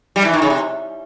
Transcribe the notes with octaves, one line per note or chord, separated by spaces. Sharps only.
G3
E3
D#3
C#3
C3